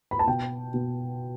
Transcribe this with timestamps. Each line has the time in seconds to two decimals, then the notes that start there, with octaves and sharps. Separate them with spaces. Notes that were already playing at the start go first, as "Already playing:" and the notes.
0.11 B5
0.19 A5
0.27 B2 G5
0.74 B2